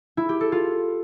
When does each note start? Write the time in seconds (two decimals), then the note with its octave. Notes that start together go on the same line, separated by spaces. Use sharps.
0.17 E4
0.29 G4
0.40 A4
0.52 F4